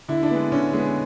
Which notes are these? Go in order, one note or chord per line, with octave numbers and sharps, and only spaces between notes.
D3 E4
D4
G#3 B3
D3 C#4
G#3 B3